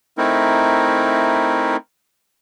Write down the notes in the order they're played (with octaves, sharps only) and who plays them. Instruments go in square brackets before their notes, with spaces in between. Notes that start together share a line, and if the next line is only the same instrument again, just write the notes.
[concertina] A3 C4 D#4 E4 A#4